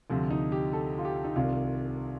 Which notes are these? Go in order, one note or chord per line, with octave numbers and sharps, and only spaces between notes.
D2 C3 F3
D#4
G4
A4
F4
G4
D#4
C2 C3 D#3 F4